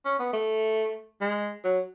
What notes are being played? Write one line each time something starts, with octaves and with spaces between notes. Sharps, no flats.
C#4
B3
A3
G#3
F#3